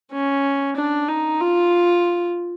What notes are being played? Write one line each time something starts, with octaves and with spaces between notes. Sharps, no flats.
C#4
D4
D#4
F4